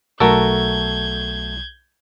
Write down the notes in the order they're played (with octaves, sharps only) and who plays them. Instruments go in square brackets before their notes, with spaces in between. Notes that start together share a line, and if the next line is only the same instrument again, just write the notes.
[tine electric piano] B1 [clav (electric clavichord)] A3 F#4 A4 [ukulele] A#4 [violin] G6 G#6